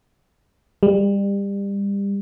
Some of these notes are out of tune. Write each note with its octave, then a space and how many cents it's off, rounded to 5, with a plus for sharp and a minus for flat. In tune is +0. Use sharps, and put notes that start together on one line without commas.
G3 +30